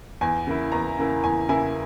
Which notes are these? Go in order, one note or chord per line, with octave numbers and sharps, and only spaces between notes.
E2 G#5
C#3 E3 A#3 E4
E2 A#5
C#3 E3 A#3 E4
E2 G#5
C#3 E3 A#3 E4 G#5